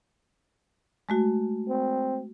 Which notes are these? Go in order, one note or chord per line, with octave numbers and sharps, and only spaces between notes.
G#3 A3 F#4
C4